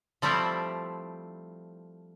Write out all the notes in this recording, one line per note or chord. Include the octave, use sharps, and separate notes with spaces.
F3 G3 A3 C4 E4